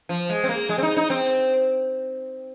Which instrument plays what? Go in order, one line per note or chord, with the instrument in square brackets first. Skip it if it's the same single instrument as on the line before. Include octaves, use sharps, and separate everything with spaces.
[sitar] F3
G#3
C4
A#3
G#3
C4
D#4
D#4
C4